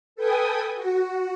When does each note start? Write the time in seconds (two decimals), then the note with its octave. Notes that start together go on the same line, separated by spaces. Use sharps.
0.16 A4 B4 G5 G#5 D#6
0.75 F#4